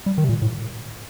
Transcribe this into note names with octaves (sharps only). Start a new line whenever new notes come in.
G3
D#3
C3
A#2
A2